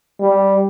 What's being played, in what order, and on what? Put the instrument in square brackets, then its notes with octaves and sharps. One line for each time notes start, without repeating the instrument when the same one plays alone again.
[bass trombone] G3